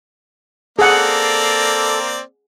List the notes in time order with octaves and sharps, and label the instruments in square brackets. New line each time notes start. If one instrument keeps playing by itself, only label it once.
[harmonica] A#3 C4 D5 [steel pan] G#4 F#5 [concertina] A4